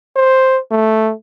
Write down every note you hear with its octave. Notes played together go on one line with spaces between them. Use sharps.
C5
A3